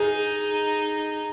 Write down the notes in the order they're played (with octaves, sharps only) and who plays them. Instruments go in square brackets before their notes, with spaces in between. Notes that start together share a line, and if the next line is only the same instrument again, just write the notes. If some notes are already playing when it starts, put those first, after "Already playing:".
Already playing: [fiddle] D#4 [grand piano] G#4